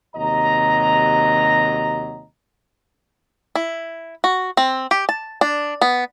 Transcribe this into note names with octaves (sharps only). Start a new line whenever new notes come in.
D#2 C3 F#3 D#5 A#5
E4
F#4
C4
G4
A5
D4
B3